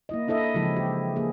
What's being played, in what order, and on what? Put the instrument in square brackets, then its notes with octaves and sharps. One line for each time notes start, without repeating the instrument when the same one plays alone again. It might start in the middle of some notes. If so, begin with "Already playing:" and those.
[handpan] A#3 E4 D#5
D4 E4 A4 D#5 E5
C#3 E3 F3 G#3 E4 G4
G4
A#3 G#4